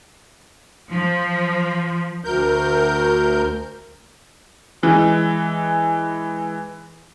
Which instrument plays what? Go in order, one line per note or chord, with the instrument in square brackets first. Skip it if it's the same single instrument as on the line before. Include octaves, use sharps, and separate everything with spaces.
[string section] F3
[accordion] D2 A#4 G6
[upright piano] E3 G#3